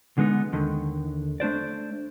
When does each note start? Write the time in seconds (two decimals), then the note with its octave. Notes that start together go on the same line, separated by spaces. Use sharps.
0.18 D3 G#3 B3 D#4
0.53 D#2 D3 D#3
1.40 A3 D4 C5 D5